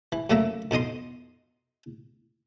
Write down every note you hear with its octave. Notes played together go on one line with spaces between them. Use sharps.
E3
F#2 C#3 A3 A#3 E5 A#5
F2 B2 D#4 D#5 C6